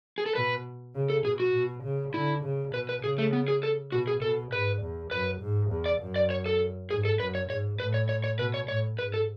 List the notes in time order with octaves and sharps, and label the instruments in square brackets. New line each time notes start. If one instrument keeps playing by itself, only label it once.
[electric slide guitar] G#4
A4
[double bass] B2 [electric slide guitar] B4
[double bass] C#3
[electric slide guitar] A4
[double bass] B2 [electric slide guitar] G#4
[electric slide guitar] F#4
[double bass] B2
C#3
[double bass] D3 [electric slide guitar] E4
[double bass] C#3
[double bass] B2 [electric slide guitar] B4
[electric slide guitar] B4
[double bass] C#3 [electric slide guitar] G#4
[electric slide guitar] A3
B3
G#4
A4
[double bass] B2 [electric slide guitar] F#4
[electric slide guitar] G#4
[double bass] B2 [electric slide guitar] A4
[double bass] G#2 [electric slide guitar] B4
[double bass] E2
[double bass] F#2 [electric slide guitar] B4
[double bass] G#2
E2
[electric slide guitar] D5
[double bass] F#2
[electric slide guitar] D5
C#5
A4
[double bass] G#2 [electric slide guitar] G#4
[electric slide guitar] A4
[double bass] F#2 [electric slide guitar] B4
[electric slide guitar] C#5
[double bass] G#2 [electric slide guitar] C#5
[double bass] A2 [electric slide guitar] B4
[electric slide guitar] C#5
C#5
C#5
[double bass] B2 [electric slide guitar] B4
[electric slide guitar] C#5
[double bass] A2 [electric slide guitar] C#5
[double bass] G#2 [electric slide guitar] B4
[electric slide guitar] A4